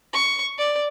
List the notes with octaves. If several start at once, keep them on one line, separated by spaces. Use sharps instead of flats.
C#6
D5